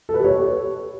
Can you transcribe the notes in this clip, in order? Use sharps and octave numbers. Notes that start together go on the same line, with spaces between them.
A4
B4
G4
C#5